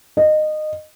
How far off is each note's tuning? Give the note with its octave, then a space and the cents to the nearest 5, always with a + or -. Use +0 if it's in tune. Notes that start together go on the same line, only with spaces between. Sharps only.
D#5 -20